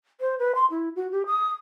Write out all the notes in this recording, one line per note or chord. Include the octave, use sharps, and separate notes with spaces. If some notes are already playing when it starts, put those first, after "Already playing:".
C5
B4
C6
E4
F#4
G4
D#6